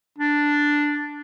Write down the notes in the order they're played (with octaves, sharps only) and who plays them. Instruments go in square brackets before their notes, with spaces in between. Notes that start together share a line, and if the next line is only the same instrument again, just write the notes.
[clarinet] D4